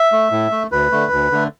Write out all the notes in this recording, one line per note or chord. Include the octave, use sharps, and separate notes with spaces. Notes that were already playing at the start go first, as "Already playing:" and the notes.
Already playing: E5
A3
A2
A3
D2 B4
D3 A3
D2
D3 A3